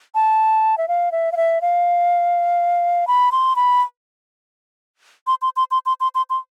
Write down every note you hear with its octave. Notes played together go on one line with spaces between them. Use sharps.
A5
E5
F5
E5
F5
E5
F5
B5
C6
B5
C6
C6
C6
C6
C6
C6
C6
C6